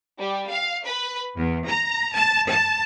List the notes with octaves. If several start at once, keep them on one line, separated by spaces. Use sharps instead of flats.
G3
F5
B4
E2
A#5
A5
A5